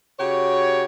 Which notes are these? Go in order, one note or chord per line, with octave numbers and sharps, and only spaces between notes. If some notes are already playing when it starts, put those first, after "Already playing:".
C#3 F#4 G4 C#5